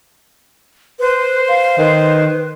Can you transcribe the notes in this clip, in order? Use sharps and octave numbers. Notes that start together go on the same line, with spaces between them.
B4 C5
F5
D#3 B4